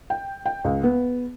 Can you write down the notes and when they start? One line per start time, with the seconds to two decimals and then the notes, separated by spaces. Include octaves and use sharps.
0.10 G5
0.46 G5
0.64 C#2
0.83 B3